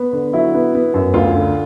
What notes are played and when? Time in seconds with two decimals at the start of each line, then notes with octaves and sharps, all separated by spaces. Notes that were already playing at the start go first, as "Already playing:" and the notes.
Already playing: B3
0.13 D3
0.33 F#3 E4
0.54 B3
0.74 B3
0.94 F#2
1.14 D2 F4
1.35 D3